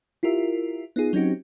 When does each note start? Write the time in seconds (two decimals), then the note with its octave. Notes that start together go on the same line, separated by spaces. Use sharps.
0.23 E4 F4 G4 A#4 E5
0.96 B3 D#4 F4 G#4
1.13 F#3 C4 C#4 D#4 F#4 G4